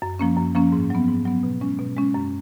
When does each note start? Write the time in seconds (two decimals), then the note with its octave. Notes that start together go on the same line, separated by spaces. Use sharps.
0.02 F#2
0.19 F3 A#3 C#4
0.37 F#2
0.55 F3 A#3 C#4
0.72 G#2
0.90 F#3 B3
1.08 G#2
1.26 F#3 B3
1.43 B2
1.61 G#3 C#4
1.79 B2
1.97 G#3 C#4
2.14 F#2